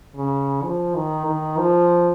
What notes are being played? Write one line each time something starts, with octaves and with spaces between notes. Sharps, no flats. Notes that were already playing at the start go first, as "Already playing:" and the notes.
C#3
F3
D#3
D#3
F3